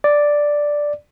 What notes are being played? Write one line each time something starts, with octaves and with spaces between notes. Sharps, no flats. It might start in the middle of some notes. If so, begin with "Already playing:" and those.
D5